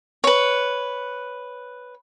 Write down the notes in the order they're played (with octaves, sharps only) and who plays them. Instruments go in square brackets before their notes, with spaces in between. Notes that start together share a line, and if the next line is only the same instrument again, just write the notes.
[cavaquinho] B4 C#5